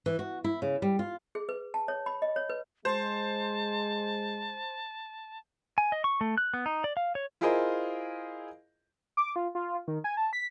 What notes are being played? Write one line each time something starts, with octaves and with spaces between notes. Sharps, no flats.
E3
F#4
E4
C#3
G3
F4
G#4
B4
A5
C#5
B5
D#5
C#5
B4
G#3 C5 A5
G#5
D#5
C#6
A3
F#6
B3
D#4
D5
F5
C#5
E4 F4 G#4 A#4 C5 D#5
D6
F4
F4
D#3
G#5
A5
B6